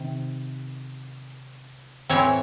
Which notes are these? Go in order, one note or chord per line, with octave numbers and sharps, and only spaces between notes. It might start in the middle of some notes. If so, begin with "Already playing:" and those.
Already playing: C3 D#3
A2 E3 C4 C#5